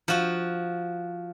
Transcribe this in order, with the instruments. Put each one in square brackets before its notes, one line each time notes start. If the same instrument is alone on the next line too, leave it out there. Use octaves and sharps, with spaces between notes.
[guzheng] F3 F#4